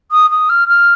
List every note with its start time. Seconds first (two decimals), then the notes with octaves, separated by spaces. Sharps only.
0.11 D#6
0.30 D#6
0.49 F6
0.68 F6